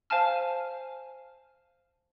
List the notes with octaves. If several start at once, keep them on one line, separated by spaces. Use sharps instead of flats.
C5 F5 G#5 A5 F6